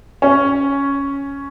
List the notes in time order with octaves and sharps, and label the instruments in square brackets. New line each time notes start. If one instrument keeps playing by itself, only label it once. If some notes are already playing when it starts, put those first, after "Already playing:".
[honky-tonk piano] C#4